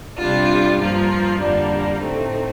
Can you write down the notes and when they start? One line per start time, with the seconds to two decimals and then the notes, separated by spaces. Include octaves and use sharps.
0.18 C3 G3 D4 F4
0.78 G2 F3 A#3 F4
1.39 F2 D3 G3 A#3 D4
2.00 A2 A3 C4 D#4